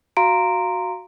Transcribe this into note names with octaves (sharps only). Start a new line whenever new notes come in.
F#4 F5 A#5 C6 D7